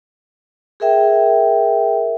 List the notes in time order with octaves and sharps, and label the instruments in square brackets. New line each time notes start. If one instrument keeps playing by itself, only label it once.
[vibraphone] G#4 A#4 E5 G5